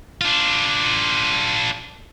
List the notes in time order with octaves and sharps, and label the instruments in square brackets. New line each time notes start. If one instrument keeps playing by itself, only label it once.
[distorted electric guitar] D4 F4